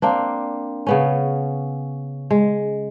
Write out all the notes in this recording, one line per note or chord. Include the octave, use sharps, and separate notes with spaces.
A#3 C4 D4
C#3 B3 C#4
G#3